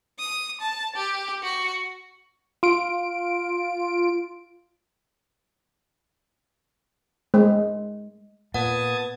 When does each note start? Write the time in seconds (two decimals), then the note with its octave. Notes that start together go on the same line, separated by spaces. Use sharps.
0.19 D#6
0.61 A5
0.96 G4
1.43 F#4
2.63 F4 D7
7.34 G#3
8.54 A#2 B3 F#5 A5 D#6 G#6